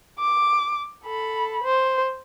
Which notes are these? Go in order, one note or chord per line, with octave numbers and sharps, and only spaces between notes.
D6
A4 B5
C5